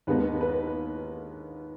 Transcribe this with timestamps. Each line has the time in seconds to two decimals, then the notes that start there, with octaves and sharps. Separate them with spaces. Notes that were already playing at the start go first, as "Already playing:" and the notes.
0.07 D#2 D#3 G#3 B3 D#4 B4
0.41 B4